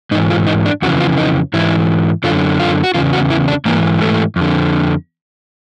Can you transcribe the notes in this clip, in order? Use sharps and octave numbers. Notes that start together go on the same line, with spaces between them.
G#2 E3 D#4
F4
D#4
D4
F2 C#3 E3 F#4
F4
D#4
G#2 E3 E4
F#2 D3 F4
F4
F#4
E2 C#3 F4
F#4
E4
D4
G#2 E3 A#3
A3
F2 D3